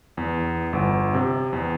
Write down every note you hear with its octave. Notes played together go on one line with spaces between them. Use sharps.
E2
G1
C3
E2